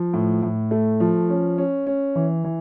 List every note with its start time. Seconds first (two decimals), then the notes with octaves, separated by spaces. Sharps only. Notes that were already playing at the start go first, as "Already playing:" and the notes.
Already playing: F3
0.14 A2
0.43 A2
0.71 A3
1.00 F3
1.30 C#4
1.58 C#4
1.87 C#4
2.16 E3
2.44 E3